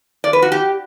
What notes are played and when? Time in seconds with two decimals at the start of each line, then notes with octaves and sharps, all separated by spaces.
0.24 D5
0.33 B4
0.42 F#4
0.52 G4